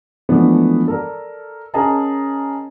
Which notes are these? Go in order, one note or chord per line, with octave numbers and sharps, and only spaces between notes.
E3 F3 G#3 A3 B3 D4
A4 A#4 D5
C#4 G#4 A#4 D#5 A5 A#5